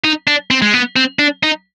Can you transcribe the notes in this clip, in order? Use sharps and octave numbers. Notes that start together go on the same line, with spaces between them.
D#4
D4
C4
G#3
B3
C4
D4
D#4